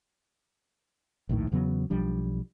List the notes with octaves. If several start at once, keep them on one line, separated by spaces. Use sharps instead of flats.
A#1 D#2 A2 D#3
E2 C#3 F#3 B3
B1 F3 G3 D4